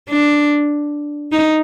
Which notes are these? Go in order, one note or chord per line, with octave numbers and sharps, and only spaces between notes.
D4
D#4